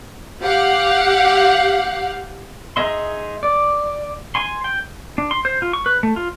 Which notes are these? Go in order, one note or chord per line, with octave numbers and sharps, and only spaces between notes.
G4 F5 F#5
D#4 G#4 D#5 E5 C6
D5
G#5 C6
G5
D4
C6
C5
F4
C#6
B4
A3
F4